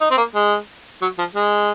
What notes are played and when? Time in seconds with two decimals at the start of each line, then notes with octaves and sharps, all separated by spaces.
0.01 D#4
0.11 C4
0.17 A#3
0.35 G#3
1.02 F#3
1.18 F3
1.35 G#3